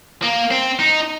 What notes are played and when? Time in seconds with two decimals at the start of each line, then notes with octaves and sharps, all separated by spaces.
0.23 A#3
0.51 C4
0.79 D#4